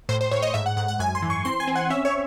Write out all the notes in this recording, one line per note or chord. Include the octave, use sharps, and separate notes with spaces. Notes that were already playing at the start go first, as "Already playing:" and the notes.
A2 C5
C5
A2 C#5
D#5
G#2 E5
F#5
G#2 F#5
F#5
F#2 G#5
C6
E3
C#6
C4 C6
G#5
C4
F#5
C#4 E5
C#5